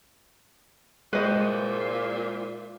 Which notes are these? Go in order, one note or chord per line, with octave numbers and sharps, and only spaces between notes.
A#2 G#3 E4 G#4 B4 C5 D#5